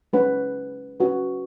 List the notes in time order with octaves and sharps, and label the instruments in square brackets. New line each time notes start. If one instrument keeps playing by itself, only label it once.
[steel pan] G#3 C#4 B4 F#5
C#4 F#4 B4